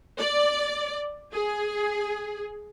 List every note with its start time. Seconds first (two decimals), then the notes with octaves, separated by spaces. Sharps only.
0.19 D5
1.33 G#4